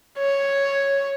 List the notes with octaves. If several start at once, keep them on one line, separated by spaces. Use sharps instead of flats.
C#5